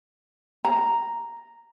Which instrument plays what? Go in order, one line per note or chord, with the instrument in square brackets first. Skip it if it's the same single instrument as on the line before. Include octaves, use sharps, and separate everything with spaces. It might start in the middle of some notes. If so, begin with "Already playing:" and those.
[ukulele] A#5